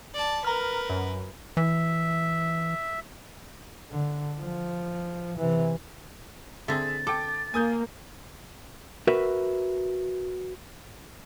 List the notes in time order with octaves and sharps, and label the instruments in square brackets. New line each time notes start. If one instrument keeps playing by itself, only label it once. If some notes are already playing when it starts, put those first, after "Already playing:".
[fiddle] D5 A5
[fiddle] A#4 B4 [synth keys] A#5 F6
[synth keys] F#2
[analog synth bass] E3 [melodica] E5
[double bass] D3
F3
C3 E3
[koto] D3 C4 [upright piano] G#4 E5 [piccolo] A6
[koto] A4 [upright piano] G5 D6
[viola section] A#3 [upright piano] G#5 D#6 G6
[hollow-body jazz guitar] F#4 A#4 B4 E5